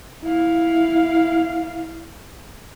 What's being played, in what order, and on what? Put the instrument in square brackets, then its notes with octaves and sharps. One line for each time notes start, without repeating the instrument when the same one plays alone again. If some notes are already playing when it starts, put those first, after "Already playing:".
[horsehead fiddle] E4 F5